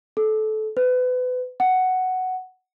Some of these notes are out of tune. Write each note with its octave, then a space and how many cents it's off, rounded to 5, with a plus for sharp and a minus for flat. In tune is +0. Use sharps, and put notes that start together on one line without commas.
A4 -20
B4 +30
F#5 +5